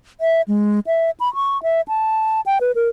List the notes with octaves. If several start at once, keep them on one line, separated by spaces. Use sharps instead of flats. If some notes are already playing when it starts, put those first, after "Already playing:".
E5
G#3
E5
B5
C#6
E5
A5
G5
B4
A#4